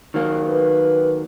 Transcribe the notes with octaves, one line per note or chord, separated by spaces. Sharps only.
D#3 F#3 A#3
B4